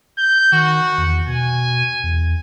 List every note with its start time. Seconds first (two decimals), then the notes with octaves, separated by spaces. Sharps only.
0.18 G6
0.52 D#3 F#4
0.98 E2
1.27 B2 G#5
2.03 E2